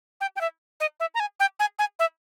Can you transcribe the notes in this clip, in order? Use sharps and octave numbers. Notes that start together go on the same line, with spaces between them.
G5
G5
E5
D#5
E5
A#5
G#5
G5
G#5
G#5
E5